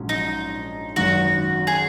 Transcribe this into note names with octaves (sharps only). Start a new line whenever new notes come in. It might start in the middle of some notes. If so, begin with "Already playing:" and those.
Already playing: A#1 G#2 F#3 C#4
D#4
G#1 F#2 D#3 F#4
G#4